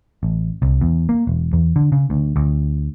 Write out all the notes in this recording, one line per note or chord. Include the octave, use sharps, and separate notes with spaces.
A1
C2
E2
A#3
E1
E2
D3
C#3
D2
D2